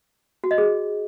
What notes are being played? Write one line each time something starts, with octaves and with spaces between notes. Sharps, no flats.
F#4
D#5
G#4